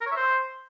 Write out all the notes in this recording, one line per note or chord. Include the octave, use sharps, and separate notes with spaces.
A#4
C#5
E5
C5